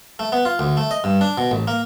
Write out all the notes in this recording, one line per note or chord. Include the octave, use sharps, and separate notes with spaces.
A3
B3
F4
D2
A3
D#5
G2
D4
B2
A1
A#3